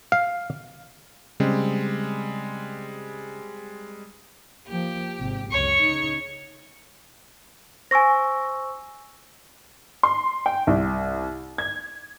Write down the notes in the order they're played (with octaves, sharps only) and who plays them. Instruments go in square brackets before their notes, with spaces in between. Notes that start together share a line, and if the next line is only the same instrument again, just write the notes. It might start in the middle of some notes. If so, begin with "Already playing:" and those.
[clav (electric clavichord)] F5
[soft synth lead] C#3 [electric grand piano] G3 G#3 C4
[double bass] F3 A#3 [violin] G4
[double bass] G#1 C3
[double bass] C#2 F#2 [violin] C#5 C#6
[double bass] C#3 D#4
[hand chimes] C5 C#6 E6 [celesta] G#5 A#6
[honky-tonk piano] C6
G5
C2
G#6